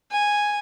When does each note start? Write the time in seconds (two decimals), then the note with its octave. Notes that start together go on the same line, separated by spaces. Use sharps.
0.11 G#5